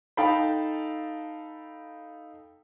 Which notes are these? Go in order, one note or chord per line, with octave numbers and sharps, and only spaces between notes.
D#4 A4 F5 G5 A5 B5